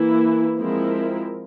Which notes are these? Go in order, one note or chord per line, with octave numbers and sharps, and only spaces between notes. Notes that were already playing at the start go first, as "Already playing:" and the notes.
Already playing: E3 A#3 E4
F3 G#3 C4 E4 A#4